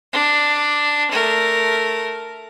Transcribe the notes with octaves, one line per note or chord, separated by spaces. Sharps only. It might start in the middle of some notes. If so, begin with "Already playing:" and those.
D4
A3 A#4